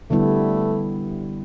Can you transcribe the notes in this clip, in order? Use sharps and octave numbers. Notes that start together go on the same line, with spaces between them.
D3 G3 A3 B3 E4